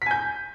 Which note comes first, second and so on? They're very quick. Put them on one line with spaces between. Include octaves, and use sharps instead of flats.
B6 G#5 G6